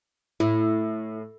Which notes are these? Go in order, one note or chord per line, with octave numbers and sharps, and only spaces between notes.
A2 E4